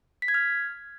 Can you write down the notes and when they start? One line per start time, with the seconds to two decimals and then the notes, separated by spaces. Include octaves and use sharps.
0.22 B6
0.28 G#6
0.34 F6